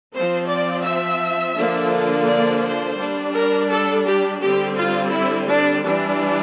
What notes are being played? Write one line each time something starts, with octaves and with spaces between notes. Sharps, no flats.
F3 C4 C5
D5
E5
D3 F3 A#3 D4
D5
C5
G3 D4
A#4
A4
G4
D3 G3 C4 G4
F4
E4
D4
E3 G3 D4